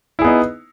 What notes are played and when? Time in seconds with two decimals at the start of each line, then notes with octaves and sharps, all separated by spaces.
0.19 E4
0.22 G#4
0.24 B3
0.27 D#4